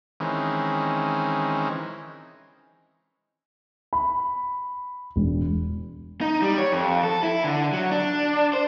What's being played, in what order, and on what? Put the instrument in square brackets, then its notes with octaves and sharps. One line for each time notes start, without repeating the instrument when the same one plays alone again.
[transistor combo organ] D#3 E3 G#3 C4 C#4
[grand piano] B5
E1
[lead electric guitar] D#4
G3
C#5
F2
A4
E4
D3
F#3
D4
C5